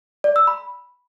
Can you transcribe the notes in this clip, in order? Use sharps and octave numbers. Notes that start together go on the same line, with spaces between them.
D5
E6
B5